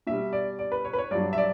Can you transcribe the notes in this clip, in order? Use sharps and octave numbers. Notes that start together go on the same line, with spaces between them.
B2 G3 E5
D5
D5
B4
C#5
B4
C#5
G2 F#3 D5
E5
D5